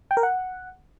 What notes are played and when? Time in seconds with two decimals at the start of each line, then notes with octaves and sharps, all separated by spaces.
0.11 G5
0.17 A#4
0.23 F#5